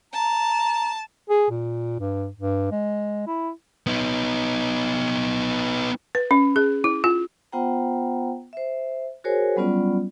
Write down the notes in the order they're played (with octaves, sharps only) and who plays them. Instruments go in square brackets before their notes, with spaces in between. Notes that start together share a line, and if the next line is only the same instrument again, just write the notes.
[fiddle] A5 [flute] A#5
[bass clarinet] G#4
A#2
G2
G2
G#3
E4
[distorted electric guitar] B3 D#4
[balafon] B4
C#4
G#4
E4
F4
[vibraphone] B3 F4 C5 F#5 G5 A#5
C5 E5
F#4 G#4 A#4 C5 C#5 G#5
F#3 G3 B3 C#4 F4 D5